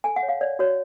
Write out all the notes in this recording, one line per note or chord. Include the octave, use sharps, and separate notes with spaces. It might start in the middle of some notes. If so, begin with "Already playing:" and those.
A4 G#5
F#5
C#5
F5
C#5 D5
F#4 C#5